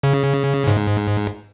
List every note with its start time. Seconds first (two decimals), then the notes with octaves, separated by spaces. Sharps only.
0.03 C#3
0.67 G#2